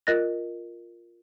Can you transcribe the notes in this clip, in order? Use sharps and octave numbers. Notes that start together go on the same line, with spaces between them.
F4 A#4 D#5 F#6 A6 A#6